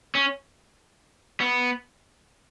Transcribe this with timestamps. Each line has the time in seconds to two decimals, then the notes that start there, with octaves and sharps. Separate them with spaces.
0.15 C#4
1.40 B3